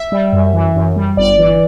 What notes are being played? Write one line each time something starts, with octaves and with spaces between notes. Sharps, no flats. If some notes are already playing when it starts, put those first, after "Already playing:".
Already playing: E5
G3
F#2
E3
F#2
G3
G1 D5
E3